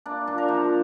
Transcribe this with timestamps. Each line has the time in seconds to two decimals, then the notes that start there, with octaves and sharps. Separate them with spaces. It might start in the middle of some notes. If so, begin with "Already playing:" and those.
0.06 A#3 D4
0.27 A#2 D4
0.38 A#4
0.48 F3 C5